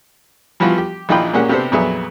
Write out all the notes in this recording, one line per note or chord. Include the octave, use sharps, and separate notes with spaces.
E3 F3 G3 B3 F4 F#4
G4
A#1 E3 D#4 F4 G5 B5
A#2 G#3 A#3 C#4 G4 F#5
C3 B3 D4 G4 A4 C5
F2 A#2 F#3 B3 G#4 E5